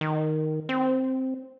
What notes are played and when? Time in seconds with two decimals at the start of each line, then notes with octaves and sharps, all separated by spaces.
0.01 D#3
0.69 C4